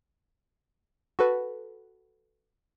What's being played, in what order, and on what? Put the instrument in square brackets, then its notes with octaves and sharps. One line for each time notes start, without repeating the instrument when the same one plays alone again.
[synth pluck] F#4 A4 B4